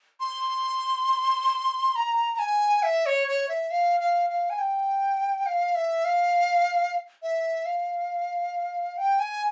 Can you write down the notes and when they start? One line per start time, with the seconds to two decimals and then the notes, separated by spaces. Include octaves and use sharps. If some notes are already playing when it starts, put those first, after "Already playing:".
0.20 C6
1.96 A#5
2.34 A#5
2.39 G#5
2.83 E5
3.06 C#5
3.28 C#5
3.49 E5
3.71 F5
4.00 F5
4.30 F5
4.50 G#5
4.59 G5
5.46 F5
5.75 E5
6.05 F5
7.23 E5
7.66 F5
8.98 G5
9.19 G#5